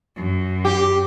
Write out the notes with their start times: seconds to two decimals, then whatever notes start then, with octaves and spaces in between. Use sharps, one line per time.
0.16 F#2
0.65 G4